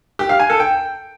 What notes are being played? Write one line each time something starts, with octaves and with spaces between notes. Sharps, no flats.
G4
F5
G#5
A4
G5